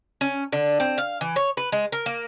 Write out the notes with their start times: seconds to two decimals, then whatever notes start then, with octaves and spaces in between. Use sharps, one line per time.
0.21 C#4
0.52 D3
0.80 C4
0.98 F5
1.21 E3
1.36 C#5
1.57 B4
1.72 G#3
1.92 A#4
2.06 A#3